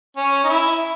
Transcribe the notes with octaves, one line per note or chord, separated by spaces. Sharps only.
C#4
D#4
E4